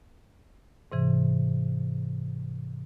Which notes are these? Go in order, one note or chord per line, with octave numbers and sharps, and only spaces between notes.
G#2 C3 E3